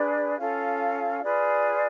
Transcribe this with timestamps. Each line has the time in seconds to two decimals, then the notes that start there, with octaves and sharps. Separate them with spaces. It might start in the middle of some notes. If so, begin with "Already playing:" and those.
Already playing: D4 G#4 B4 D5
0.39 C#4 F4 A4 F5
1.22 F4 G#4 B4 D5